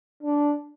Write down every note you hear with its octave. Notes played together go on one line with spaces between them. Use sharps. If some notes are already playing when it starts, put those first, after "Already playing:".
D4